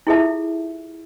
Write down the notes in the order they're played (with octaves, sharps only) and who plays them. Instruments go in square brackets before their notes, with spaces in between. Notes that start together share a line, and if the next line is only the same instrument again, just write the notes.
[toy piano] E4 F4 G#4 A4 E5 A5